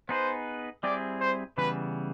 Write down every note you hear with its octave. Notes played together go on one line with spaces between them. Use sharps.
B3 D#4 G#4 B4 C5
G3 C4 E4 G#4 D5
C5
C#3 E3 G3 B3 B4